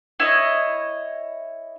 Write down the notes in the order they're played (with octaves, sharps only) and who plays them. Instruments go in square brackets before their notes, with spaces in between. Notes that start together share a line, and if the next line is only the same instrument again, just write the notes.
[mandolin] E4 C#5 D#5